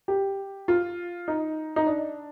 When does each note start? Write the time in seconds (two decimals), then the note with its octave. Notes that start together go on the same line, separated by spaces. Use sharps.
0.08 G4
0.68 F4
1.28 D#4
1.76 D#4
1.87 D4